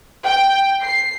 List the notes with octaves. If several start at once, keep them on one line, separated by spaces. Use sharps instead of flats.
G5
C7